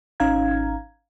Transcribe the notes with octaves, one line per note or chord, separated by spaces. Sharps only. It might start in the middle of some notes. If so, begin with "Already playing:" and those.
G#1 C#4 D#4 F5 A#5 G#6